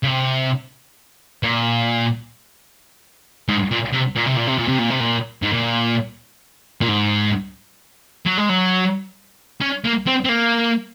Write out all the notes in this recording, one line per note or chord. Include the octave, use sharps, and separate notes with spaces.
C#3
C3
A#2
G#2
A#2
C3
A#2
C3
A#2
C3
A#2
C3
A#2
C3
A#2
G#2
A#2
A#2
G#2
F#3
G#3
F#3
C#4
A#3
C4
C4
A#3